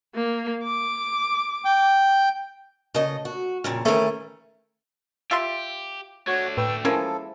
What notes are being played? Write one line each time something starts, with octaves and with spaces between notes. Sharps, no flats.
A#3
D6
G5
C#3 A3 D#5
F#4
F2 A#2 C#3
D#3 E3 A3 C#4
F4 G4 E5 C6
A3 D4 F#4 C#5 G#6
A2 B4 G5 C#6 E6
E3 F3 G#3 A#3 C#4 A4 A#4